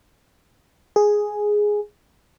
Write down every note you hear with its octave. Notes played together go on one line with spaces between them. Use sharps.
G#4